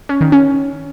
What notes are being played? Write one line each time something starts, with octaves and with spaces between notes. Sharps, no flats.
C#4
D#3
C#4